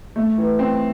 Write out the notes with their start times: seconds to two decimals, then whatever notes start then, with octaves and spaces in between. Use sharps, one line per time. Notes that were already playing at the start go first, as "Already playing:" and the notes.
0.16 A3
0.38 E3
0.59 C4